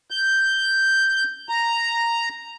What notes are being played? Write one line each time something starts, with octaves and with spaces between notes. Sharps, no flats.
G6
A#5